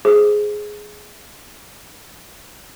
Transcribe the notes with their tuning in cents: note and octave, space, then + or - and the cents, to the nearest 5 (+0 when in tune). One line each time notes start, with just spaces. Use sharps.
G#4 +5 C5 +0 D6 +0